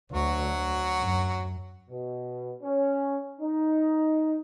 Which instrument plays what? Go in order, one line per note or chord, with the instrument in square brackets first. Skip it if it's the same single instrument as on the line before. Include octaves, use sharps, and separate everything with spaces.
[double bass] D2 [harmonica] F#3 F#4
[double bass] F#2
[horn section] B2
C#4
D#4